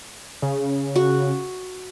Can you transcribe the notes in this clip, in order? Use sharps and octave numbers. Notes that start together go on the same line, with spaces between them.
C#3
F#4